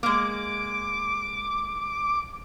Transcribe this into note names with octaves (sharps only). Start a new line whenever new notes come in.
G#3 A#3 D6